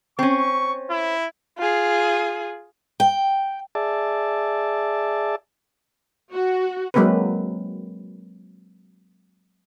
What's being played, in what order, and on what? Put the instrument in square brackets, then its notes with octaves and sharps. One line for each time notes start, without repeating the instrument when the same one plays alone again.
[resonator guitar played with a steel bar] C4 C#4 [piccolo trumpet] C#6
[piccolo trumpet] E4
[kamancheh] F4 G#4
[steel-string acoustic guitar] G5
[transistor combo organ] G#4 D5 E5 A5
[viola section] F#4
[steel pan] F#3 G#3 A#3 C4 A#4 B4